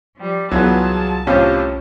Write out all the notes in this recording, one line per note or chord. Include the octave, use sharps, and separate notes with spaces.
F3 G3
C2 E3 F#3 B3 F4 G#4 A5
A2 C3 C#4 F4 G4